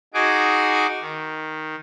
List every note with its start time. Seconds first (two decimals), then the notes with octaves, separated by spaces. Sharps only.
0.14 D#4 F#4 G#4 G#5 D6
1.01 D#3